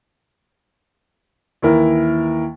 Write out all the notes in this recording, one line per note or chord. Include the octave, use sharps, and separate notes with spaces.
D#2 E3 E4 A#4